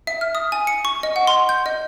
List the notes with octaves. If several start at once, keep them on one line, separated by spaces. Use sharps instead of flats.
E5
F6
D#6
G#5
C#7
C#6
D#5
F#5
C6
G6
D#5